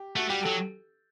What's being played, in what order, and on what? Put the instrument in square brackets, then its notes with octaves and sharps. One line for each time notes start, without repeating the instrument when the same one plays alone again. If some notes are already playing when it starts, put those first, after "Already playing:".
Already playing: [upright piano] G4
[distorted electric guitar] A3 [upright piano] F#4
[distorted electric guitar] G3 [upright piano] G4
[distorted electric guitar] F#3 [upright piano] A4